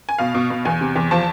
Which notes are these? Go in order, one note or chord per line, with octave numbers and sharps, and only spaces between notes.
G#5
B2 F5
B2
B2
E2 G#5
C3
E2
F3 A5